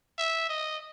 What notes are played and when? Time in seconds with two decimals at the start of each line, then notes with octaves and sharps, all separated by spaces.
0.18 E5
0.49 D#5